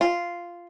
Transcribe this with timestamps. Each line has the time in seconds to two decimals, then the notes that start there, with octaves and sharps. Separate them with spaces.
0.01 F4